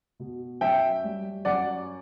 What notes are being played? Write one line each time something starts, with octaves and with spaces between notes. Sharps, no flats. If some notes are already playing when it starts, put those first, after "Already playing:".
B2
F#2 E5 G5
G3
F#2 D5 F#5